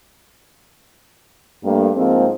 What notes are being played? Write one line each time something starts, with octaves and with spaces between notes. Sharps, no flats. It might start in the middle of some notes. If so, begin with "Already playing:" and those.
G2 A3 A#3
G#2 F3 G#3 A#3 C4